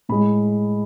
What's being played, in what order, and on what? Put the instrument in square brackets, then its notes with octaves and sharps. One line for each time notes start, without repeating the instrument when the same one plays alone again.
[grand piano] A2 G#3 B5